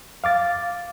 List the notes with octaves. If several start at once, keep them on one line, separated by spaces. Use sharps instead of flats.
F5 D6 A6